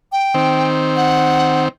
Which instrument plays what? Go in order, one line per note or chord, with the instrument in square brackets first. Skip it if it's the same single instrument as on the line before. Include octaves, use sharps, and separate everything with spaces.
[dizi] G5
[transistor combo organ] D#3 C4
[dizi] F#5